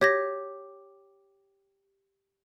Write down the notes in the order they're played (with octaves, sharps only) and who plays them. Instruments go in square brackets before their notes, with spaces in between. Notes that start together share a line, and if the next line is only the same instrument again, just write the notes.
[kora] G4 [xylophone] C#5 G#6 A#6